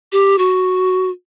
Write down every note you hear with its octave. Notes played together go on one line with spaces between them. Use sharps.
G4
F#4